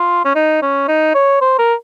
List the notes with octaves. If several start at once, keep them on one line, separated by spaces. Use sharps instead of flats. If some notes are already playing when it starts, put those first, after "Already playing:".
Already playing: F4
C#4
D#4
C#4
D#4
C#5
C5
A#4